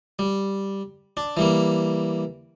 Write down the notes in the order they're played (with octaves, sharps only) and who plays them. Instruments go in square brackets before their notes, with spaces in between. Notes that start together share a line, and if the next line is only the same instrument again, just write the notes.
[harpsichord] G3
D4
E3 G3 A#3